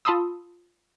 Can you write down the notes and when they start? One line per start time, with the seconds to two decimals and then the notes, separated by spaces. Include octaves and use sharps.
0.05 F4 A5 B5 C6 D#6 E6